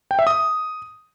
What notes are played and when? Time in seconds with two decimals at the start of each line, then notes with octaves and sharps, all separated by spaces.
0.11 G5
0.19 E5
0.27 D#6